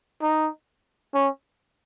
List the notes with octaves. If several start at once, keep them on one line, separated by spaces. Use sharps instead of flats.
D#4
C#4